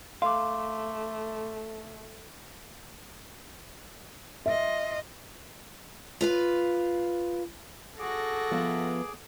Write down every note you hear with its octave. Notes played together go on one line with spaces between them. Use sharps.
A3 F5 C6 D6
F4 D#5 E5
F4 B4 F5
F#4 G#4 A4 D6 A#6
F3 B3 E5